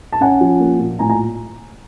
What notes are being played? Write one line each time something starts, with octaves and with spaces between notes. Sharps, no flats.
A5
C#4 F#5 G#5
F3
A#3
A#2
A2 G#5 A#5
G#5 A#5